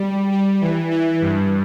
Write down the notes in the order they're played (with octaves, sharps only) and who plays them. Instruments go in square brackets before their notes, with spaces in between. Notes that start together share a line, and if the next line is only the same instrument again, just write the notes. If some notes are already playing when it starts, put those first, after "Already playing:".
Already playing: [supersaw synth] G3
G3
E3
E3
G2